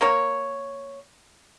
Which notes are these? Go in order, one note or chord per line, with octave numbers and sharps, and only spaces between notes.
A#3 A#4 C#5